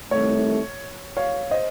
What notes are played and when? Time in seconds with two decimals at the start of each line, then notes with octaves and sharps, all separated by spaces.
0.11 C2 C3 D#3 A3 C#5
1.17 C#5 F5
1.51 C5 D#5